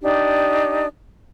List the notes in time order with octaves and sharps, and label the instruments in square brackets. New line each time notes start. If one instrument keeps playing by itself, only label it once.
[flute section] D4 D#4 G4